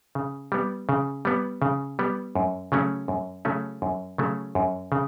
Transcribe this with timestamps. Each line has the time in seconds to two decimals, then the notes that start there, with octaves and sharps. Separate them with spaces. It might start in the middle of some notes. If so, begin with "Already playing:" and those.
0.15 C#3
0.52 G3 B3
0.89 C#3
1.25 G3 B3
1.62 C#3
1.99 G3 B3
2.35 F#2
2.72 C#3 F#3 A3 C#4
3.08 F#2
3.45 C#3 F#3 A3 C#4
3.82 F#2
4.18 C#3 F#3 A3 C#4
4.55 F#2
4.92 C#3